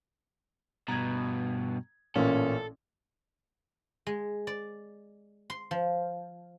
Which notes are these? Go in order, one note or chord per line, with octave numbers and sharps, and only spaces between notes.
G2 B2 A#5 G#6
A1 A#2 C#4 A4
G#3
D5
C6
F3